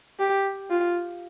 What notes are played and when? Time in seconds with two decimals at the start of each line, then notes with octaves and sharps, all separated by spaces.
0.19 G4
0.70 F4